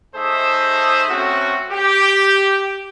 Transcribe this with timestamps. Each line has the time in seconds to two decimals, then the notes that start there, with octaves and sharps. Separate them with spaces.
0.16 A3 D#4 G#4 A4 C5 E5
1.10 A3 C4 C#4 F#4
1.72 G4